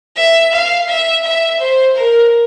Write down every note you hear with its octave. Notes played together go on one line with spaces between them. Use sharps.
E5
F5
E5
E5
C5
A#4